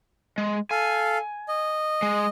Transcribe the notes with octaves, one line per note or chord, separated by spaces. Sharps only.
G#3
A4 F5 G#5
D#5
G#3